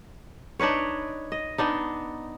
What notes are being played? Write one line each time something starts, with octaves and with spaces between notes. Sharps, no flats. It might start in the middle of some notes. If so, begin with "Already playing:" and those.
D4 D#4 B4 C#5
D#5
B3 D4 D#4